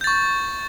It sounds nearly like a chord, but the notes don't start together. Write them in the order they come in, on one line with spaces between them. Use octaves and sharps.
G6 A6 C#6